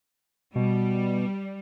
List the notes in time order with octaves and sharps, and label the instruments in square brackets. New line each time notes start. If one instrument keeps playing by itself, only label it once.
[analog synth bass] B2 [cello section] G3